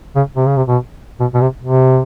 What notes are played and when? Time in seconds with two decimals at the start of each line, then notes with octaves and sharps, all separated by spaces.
0.16 C#3
0.36 C3
0.47 C#3
0.57 C3
0.68 B2
1.20 B2
1.34 B2
1.41 C3
1.63 C3